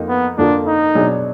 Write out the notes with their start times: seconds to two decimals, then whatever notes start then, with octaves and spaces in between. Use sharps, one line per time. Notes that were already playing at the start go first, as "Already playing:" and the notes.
Already playing: F2 F3 A#3 D#4
0.09 B3
0.38 F2 D3 F3 A#3 D4
0.67 D#4
0.95 B2 F#3 D4 G#4